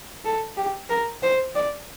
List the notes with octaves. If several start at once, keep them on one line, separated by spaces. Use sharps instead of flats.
A4
G4
A#4
C5
D5